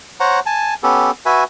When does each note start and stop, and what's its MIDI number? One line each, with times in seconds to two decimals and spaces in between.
0.20 0.40 72
0.20 0.40 73
0.20 0.40 78
0.20 0.40 82
0.46 0.74 80
0.46 0.74 81
0.83 1.11 59
0.83 1.11 61
0.83 1.11 67
0.83 1.11 69
1.26 1.44 66
1.26 1.44 71
1.26 1.44 76
1.26 1.44 80